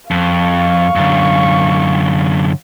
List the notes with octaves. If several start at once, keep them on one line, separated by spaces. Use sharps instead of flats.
F2 F5 C#6
F#2 D3